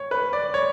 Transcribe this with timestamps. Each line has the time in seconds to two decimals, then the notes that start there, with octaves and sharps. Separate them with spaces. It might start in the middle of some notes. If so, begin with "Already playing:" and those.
Already playing: C#5
0.11 B4
0.33 D5
0.54 C#5